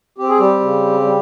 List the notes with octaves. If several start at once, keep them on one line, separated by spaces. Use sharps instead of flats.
C4 G4
G#4
G3 G4
C#3
G3